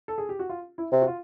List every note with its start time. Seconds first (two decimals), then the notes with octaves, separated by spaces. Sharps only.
0.08 A4
0.18 G#4
0.29 G4
0.39 F#4
0.49 F4
0.78 E4
0.92 C3
1.02 F#4
1.07 F4